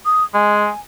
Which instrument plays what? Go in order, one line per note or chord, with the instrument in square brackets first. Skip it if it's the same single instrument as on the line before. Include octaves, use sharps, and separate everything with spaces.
[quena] D#6
[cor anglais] G#3 [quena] G#5